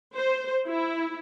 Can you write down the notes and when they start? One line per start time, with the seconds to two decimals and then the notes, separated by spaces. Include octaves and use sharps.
0.15 C5
0.68 E4